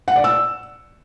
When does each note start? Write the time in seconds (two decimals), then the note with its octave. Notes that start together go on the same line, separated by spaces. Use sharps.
0.08 F#5
0.16 D5
0.24 E6